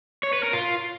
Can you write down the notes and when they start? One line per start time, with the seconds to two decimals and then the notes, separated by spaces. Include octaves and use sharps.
0.23 C#5
0.33 B4
0.43 A#4
0.53 F4